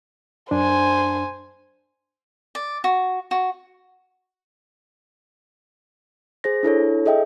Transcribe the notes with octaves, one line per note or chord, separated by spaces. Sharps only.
F#2 D4 C5 G#5
D5
F#4
F#4
G#4 C5 A#6
D4 E4 A4 C#5
G#4 A4 D#5 E5 G5